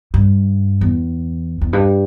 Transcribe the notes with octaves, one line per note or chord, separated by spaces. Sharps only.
G2
E2
E2
G2